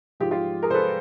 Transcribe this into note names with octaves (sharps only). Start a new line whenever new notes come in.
G#2 F3 G#3 F4 G4
F4 G4
G#4 A#4
C5
A4 B4